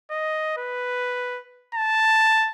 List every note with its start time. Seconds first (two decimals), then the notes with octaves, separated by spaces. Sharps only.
0.11 D#5
0.57 B4
1.75 A5